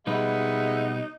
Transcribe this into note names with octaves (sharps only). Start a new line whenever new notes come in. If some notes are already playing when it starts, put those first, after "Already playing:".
B2 G3 G#3 D#4 B4 E5 F#5